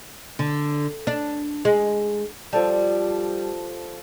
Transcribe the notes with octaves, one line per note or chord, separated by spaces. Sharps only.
D3
D4
G#3
F3 G3 A4 A5